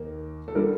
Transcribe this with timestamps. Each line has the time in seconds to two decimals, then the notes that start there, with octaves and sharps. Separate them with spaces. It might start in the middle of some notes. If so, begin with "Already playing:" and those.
Already playing: D#2 D#3 A#3
0.48 A4
0.55 D3 G3 A#3 A#4